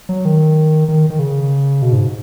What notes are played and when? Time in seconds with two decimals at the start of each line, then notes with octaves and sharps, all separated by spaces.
0.09 F#3
0.25 D#3
0.88 D#3
1.10 D#3
1.19 C#3
1.82 B2
1.93 G#2